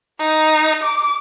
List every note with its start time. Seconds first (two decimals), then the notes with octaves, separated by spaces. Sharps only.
0.19 D#4
0.83 D6